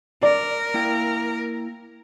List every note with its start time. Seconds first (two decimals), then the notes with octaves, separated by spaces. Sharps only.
0.23 A#4 D5
0.74 A#3 E4 G5